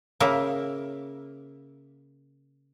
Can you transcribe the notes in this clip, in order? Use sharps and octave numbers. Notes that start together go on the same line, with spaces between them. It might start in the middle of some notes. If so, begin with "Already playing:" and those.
C#3 A#3 E5